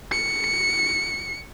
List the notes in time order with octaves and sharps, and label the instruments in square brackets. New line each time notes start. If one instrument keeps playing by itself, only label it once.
[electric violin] C#7